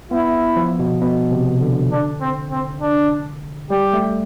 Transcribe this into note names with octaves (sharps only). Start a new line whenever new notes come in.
B3 E4
F3
B2
B2
C3
D3
D4
C4
C4
D4
G3 G4
A3